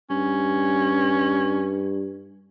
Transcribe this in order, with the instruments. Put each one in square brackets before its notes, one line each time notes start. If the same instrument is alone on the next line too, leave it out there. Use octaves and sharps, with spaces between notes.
[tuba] G2 [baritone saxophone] C#4